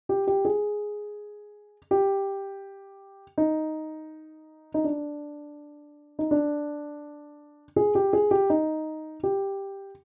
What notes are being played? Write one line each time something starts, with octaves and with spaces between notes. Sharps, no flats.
G4
G4
G#4
G4
D#4
D#4
D4
D#4
D4
G#4
G4
G#4
G4
D#4
G4